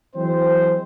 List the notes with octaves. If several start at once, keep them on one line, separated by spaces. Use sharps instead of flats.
E3 F#3 G#3 C4 C5